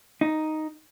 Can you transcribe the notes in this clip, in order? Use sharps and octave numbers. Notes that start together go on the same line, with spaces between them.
D#4